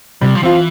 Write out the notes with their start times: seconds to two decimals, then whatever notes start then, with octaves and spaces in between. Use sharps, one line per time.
0.21 C3 G3
0.35 F3
0.42 E3 C4 F4